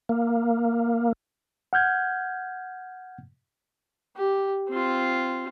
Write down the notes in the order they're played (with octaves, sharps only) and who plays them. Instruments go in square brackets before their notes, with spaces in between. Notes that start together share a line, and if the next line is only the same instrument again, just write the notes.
[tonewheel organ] A#3
[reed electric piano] F#5 F6 G6 G#6
[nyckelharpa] G4
C4 F4